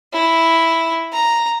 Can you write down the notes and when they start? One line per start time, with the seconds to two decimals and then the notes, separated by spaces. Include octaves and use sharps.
0.13 E4
1.13 A#5